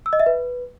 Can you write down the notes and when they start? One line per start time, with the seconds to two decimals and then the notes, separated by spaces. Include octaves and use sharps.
0.06 E6
0.13 D#5
0.20 E5
0.26 B4